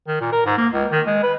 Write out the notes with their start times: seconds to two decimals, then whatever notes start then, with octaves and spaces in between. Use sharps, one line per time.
0.07 D#3
0.20 A#2
0.32 A#4
0.46 G#2
0.58 A#3
0.73 C#2
0.92 D#3
1.06 G#3
1.23 B4